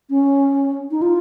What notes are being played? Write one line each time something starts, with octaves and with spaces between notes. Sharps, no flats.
C#4
D#4
F4